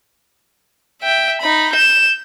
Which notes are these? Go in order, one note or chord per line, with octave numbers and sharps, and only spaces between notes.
E5 G5
D#4 B5
G6 E7